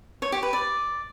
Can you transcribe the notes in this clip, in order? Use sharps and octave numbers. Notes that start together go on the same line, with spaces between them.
C#5
G4
B4
D5